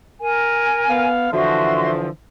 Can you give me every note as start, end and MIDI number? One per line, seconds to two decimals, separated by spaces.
0.21 1.06 70
0.21 1.06 80
0.89 1.30 59
0.89 1.30 77
1.32 2.09 50
1.32 2.09 52
1.32 2.09 53
1.32 1.91 66
1.32 1.91 76
1.32 1.91 84